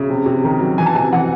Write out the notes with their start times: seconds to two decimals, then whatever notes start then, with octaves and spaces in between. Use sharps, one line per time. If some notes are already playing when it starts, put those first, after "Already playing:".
Already playing: C#3 E5
0.10 C3
0.26 C3
0.44 D#3
0.60 F#3
0.78 E3 G#5
0.86 A5
0.95 C3 G#5
1.12 E3 F#5